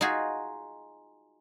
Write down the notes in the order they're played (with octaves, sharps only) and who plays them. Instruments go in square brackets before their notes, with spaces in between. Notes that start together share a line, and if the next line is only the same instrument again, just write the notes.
[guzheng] D#4 F4 F#4 G#4